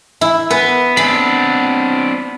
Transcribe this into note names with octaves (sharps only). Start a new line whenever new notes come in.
E4
B3 B4
C4 D4 B5